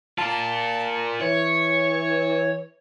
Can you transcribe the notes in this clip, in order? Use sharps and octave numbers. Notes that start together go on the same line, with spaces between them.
F4 A#4 A5
E3 C#5